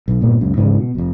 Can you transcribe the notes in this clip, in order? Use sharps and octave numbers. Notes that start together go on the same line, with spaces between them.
B1
G1 A#2 A#3 B3
C#2 F#2
G#2 C#3 E3
B2
F1 F2